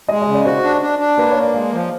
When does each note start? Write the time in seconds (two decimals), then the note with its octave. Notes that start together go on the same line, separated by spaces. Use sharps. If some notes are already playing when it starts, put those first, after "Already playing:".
0.08 G#3 D#5
0.22 D#5
0.27 C#3
0.33 D5
0.45 F#4 C5
0.64 D4
0.82 D4
0.99 D4
1.18 A#3 B4
1.30 C#5
1.36 A#3
1.42 D5
1.54 G#3 F5
1.72 F3